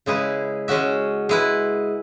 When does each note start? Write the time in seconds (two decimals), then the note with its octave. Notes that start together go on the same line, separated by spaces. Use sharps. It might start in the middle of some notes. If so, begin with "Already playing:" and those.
0.06 C#3 G#3 E4 G#4 B4
0.68 G#3 C#4 F#4 E5
1.29 G#3 E4 B4